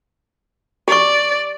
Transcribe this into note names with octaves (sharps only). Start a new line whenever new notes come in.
G4 D5 C#6